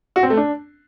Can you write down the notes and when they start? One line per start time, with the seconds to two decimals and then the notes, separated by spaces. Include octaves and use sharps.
0.16 F#4
0.23 C4
0.30 A3
0.37 D4